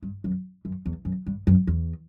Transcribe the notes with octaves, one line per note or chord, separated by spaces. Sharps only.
G2
F#2
F#2
E2
F#2
G2
F#2
E2